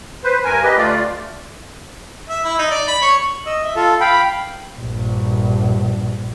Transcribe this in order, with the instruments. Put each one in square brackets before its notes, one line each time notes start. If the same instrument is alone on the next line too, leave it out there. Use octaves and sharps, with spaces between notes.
[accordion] B4 C5
G2 A#4 G#5
G4 B4 D#5
D2 A3 F4 D5
[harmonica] E5
E4
D#4
D5
B5
C#5
[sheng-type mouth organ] D#5 E6
E5
F4 A4
F5 G5 B5
[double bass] A#1 G2